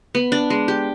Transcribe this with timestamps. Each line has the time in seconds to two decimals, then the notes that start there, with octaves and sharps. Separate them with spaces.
0.15 B3
0.32 D4
0.50 G#3
0.68 G4